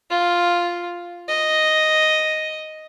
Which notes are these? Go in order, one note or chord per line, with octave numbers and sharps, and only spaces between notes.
F4
D#5